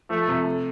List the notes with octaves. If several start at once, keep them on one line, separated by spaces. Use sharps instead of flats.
F3 A3
C3
A3